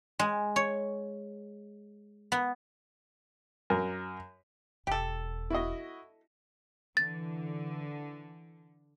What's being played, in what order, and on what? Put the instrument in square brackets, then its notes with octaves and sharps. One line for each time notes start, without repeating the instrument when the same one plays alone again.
[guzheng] G#3
C#5
B3
[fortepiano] F#2 A#4
[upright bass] E1 [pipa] G4 A4
[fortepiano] E4 F#4 D#5
[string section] D3 [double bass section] E3 [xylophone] A6